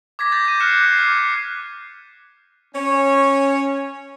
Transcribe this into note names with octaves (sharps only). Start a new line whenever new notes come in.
D6 G#6 A#6 B6
D6 G6 A6 A#6
G6 D#7
F6 F#6 A#6 C7 C#7 E7
D6 B6 C7
D6 F6 G#6 B6 C7
C#4 C#5